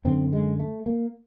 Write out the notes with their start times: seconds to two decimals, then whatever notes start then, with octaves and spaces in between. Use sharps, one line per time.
0.05 F#2 D3 C4
0.33 G#3
0.60 A3
0.86 A#3